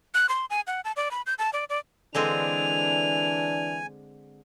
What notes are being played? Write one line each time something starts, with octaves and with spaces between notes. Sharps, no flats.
F#6
C6
G#5
F#5
A5
D5
B5
G6
A5
D5
D5
D3 E3 G#3 C4 D4 G#5 F7